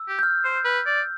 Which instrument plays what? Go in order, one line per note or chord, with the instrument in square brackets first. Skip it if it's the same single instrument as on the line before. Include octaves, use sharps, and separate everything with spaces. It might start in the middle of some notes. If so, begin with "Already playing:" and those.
Already playing: [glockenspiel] E6
[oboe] G4
[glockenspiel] G6
F6
[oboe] C5
B4
D5